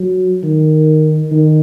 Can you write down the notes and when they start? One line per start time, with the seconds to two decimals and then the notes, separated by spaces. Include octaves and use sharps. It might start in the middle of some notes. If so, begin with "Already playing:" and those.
Already playing: F#3
0.43 D#3
1.31 D#3